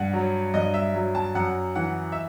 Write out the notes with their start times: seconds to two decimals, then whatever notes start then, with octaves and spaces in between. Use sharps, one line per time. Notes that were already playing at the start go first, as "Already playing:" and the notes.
Already playing: G2 F#5
0.13 F#3
0.54 G2 D#5
0.74 E5
0.95 F#3
1.15 A5
1.35 F#2 F#5
1.75 E3 F#5
2.12 E5